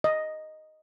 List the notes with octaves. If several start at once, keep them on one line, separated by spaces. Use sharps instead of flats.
D#5